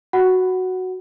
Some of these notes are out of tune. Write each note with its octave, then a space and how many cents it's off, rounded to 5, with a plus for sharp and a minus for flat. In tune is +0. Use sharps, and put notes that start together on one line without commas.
F#4 +0 F#5 +5